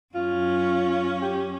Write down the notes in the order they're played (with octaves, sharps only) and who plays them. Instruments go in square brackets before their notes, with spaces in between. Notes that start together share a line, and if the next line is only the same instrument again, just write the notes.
[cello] F#2 C#4 [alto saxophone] F4
[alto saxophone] G4